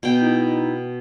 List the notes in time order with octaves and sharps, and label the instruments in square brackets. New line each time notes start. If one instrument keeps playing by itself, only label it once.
[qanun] B2 G5
[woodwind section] D#4 E4